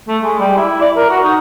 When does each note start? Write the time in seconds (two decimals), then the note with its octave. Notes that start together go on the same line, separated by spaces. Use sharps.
0.08 A3
0.23 G#3
0.39 G3
0.57 E4
0.80 D5
0.96 A#4
1.09 F#4
1.24 D#4